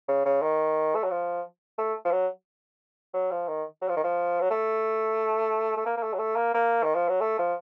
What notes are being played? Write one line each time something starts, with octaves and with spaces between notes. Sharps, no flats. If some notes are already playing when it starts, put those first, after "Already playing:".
C#3
C#3
D#3
A3
F#3
F3
A3
F3
F#3
F#3
F3
D#3
F#3
F3
D#3
F3
F#3
A3
A3
A#3
A#3
A3
F#3
A3
A#3
A#3
D#3
F3
F#3
A3
F3